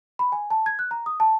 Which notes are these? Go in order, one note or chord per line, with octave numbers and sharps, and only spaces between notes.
B5
G#5
A5
G#6
F#6
A#5
D#6
A5